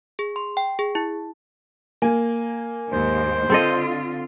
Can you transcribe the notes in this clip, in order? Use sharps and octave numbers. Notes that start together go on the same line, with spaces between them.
G#4
C6
G5
G#4
E4
A#3 G#5
D#2 G#2 C5
D3 C4 F4 A4 D#5